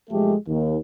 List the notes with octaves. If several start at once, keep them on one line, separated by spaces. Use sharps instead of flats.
B1 F3 G#3 A3 G4 A4
D#2